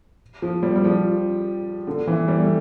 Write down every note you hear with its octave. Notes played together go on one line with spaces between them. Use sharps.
F3
G3
G3
F3
D3
E3
G3
A3